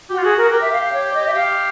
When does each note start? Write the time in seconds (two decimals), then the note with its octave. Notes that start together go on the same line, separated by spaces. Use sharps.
0.10 F#4 G4
0.18 F4
0.24 F#4 G#4
0.38 F#4 A#4
0.52 G4 A#4
0.62 E5
0.73 F5
0.83 F5
0.93 C#5
1.14 D#5
1.27 E5
1.34 G4 F5